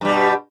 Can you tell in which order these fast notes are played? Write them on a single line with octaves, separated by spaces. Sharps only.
G2 G3 B2